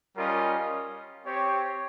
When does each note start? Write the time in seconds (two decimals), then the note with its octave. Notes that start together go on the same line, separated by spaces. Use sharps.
0.16 G3 C#4 F4 A#4 D#5
1.24 C4 G4 C#5